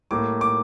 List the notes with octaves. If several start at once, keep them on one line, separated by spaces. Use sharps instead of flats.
A2 G3 A#3 D6
D6